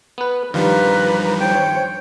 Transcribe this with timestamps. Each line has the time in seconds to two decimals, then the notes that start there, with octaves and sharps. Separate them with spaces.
0.18 B3 B4
0.54 G2 D#3 F3 G3 F4 B4 A#5
1.40 C5 C#5 G5